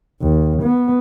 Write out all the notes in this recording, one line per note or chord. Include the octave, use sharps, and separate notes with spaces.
D#2
B3